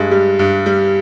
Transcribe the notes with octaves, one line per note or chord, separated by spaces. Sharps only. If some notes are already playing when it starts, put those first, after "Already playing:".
Already playing: G2 G#3
G3
G2
G3